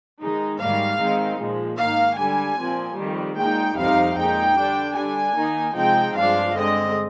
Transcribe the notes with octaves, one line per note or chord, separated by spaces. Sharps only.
D#3 G#3 D#4
G#2 D#3 G3 A#3 F5
D#3 G#3 C4 D#4
A#2 F3 G#3
G#2 D#3 A#3 D#4 F5
D3 G3 D4 G#5
A#2 F3 C4
F2 D#3 G3
A#2 G#3 D#4 G5
F2 C3 G3 C4 D#4 F5
A#2 G#3 D#4 G5
D3 G3 D4
D3 G3 D4 G#5
D#3 A#3 D#4
C3 F3 G#3 C4 D#4 G5
G2 F3 G#3 D4 F5
D3 G#3 C4 D#5